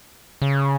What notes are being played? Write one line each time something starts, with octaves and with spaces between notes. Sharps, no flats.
C#3